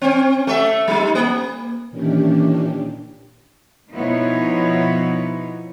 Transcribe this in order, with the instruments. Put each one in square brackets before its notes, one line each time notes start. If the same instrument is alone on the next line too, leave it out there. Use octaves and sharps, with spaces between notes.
[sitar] C4 C#4
A3 E5
G3 D#4
A#3
[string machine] A#2 D#3 E3 C#4 D4 G4
[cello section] B2 F3 B3 D#4 E4 C#5